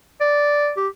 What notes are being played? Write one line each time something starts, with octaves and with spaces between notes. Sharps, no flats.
D5
G4